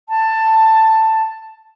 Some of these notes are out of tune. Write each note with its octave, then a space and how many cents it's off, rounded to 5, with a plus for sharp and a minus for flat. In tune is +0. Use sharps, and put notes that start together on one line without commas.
A5 +10